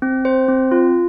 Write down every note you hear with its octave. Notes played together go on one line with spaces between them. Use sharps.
C4
C5
C4
F4